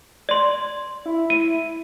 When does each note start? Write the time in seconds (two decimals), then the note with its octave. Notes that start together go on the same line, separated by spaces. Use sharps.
0.29 D5 C6
1.06 E4
1.30 D#7